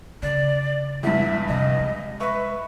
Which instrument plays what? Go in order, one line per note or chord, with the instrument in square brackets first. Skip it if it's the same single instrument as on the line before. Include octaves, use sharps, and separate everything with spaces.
[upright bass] C#3 [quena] D5
[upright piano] E2 G2 [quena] E5
[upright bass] F2 C3 [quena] D#5
[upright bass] G#3
[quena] B4 [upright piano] E5 C#6